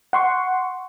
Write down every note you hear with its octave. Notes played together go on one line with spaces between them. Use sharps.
F#5 C6 C#6